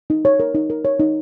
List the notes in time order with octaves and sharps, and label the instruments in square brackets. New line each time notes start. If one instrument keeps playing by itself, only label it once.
[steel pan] D#4
C#5
A#4
D#4
A#4
C#5
D#4